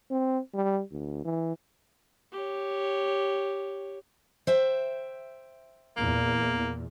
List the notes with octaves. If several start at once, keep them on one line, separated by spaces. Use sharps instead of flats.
C4
G3
D2
E3
G4 C#5
C5 E5 G5
E2 A#2 A#3